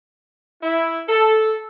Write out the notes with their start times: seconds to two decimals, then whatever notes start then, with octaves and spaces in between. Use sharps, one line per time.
0.63 E4
1.09 A4